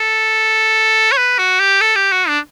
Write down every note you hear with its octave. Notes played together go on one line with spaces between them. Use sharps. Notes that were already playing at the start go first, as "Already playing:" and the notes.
Already playing: A4
C#5
B4
F#4
G4
A4
G4
F#4
D4